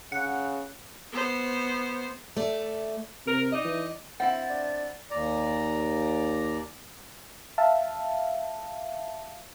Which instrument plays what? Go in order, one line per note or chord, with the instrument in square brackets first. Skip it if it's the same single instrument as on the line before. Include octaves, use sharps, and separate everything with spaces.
[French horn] C#3 [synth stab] F#5
[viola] B3 C5
[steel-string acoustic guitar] A3 D5
[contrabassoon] C3 [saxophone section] A#4
[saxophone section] D#4 D5 D#5
[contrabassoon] E3
[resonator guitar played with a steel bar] C4 E4 [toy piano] F5 F#5 [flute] A6
[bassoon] D4
[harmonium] D#2 D5 A#5
[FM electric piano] E5 F5 A5